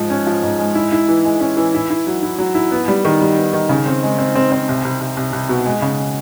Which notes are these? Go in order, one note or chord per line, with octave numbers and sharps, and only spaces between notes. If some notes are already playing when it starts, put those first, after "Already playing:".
Already playing: G#2 F3
C#4
F3
G#2
G#3
E4
E4
E3
G#3
C#4
E3
E4
E4
F#3
E4
F#3
E4
B3
G3
D#3
G3
B3
D#3
C#3
C4
G#3
C4
C4
C4
C2
C2
C2
C2
C2
B2
G#3
C#3